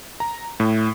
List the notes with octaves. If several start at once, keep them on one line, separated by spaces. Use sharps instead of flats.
A#5
A2